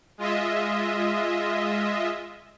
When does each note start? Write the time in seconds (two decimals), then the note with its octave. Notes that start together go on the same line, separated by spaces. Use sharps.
0.18 G#3 F4 D#5 E5